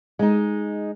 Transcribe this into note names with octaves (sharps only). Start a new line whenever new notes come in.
G#3 D#4